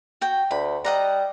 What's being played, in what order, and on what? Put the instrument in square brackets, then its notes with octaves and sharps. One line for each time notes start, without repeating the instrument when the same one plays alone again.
[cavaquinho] F#4 G5
[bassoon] D2 [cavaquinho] B5
[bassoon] G3 [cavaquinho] D#5 F#5 A#5